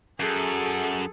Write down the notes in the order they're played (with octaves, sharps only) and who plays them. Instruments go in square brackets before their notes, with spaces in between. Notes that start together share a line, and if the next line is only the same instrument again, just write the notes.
[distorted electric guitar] F#2 [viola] G#4 A4